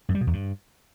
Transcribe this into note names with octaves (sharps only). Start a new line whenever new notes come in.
F#2
G3
B2
E2
G2